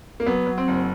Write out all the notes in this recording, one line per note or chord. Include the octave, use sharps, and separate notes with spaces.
A#3
F#3 B3
F#3
C4
F#1